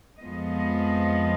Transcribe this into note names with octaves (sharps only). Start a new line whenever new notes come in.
F2 F3 G#3 B3 D#5